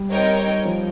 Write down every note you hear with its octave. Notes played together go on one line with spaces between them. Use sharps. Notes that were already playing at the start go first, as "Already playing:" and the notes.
Already playing: G3
C4 D#4 A#4 C#5 G5
F3